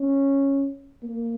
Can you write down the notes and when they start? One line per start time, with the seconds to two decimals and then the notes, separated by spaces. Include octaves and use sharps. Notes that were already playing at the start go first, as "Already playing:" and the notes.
Already playing: C#4
1.03 A#3